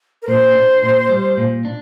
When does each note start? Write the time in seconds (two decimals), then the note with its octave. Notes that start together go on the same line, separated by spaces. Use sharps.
0.22 A#4
0.28 A#2 C5
0.54 D4
0.83 A#2
1.09 G3
1.37 A#2
1.65 D4